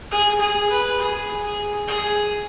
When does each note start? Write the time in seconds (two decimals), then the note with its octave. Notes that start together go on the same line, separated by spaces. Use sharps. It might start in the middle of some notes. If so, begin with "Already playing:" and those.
0.11 G#4
0.40 G#4
0.70 B4
1.00 G#4
1.44 G#4
1.88 G#4